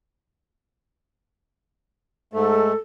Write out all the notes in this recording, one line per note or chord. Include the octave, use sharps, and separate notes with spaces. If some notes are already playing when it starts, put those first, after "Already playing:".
G#2 A3 A4